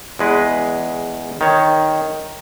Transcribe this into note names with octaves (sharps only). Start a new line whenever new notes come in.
E2 G#3 B4
D#3 C#5